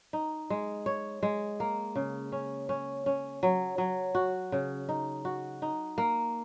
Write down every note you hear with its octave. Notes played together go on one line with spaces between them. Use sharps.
D#4
G#3
C#5
G#3
A#3
C#3
C#4
C#4
C#4
F#3
F#3
F#4
C#3
D#4
F#4
D#4
A#3